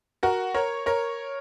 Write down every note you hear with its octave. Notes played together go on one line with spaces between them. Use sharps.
F#4 A#4
A#4 C#5
A#4 C#5